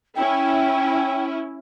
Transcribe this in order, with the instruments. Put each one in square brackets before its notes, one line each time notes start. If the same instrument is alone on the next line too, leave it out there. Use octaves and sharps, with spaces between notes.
[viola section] C#4 E4 [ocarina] G5